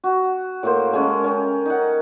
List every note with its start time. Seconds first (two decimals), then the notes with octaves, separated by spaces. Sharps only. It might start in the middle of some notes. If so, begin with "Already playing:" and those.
0.04 F#4
0.63 A2 A#3 C5
0.93 G#3 C#4 A5
1.24 C#4 A#4 G5
1.66 D#4 F#5